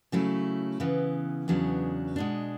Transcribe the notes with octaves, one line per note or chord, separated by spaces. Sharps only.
C#3 F#3 A3 E4
C#3 E3 B3
E2 C#3 F#3 B3 D4
B2 G#3 D4